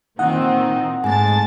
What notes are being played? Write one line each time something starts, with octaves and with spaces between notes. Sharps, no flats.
A#2 D#3 C4 D#4 F#5
G#2 A3 G#5 A5 A6